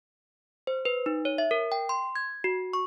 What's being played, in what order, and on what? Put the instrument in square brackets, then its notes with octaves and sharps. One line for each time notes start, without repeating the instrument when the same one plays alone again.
[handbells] C5
B4
D#4
C#5
E5
A#4
G5
C6
G#6
F#4
C#6